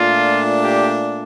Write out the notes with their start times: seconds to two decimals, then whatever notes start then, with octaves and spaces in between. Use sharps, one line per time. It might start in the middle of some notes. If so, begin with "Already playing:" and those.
Already playing: A#2 A3 D4 F4
0.63 G4